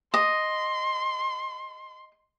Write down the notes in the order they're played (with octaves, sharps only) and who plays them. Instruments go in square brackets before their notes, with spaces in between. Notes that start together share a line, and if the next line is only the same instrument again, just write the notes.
[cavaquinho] D#5 [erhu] C6